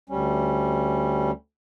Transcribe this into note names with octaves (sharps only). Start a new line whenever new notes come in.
D2 G3 C#4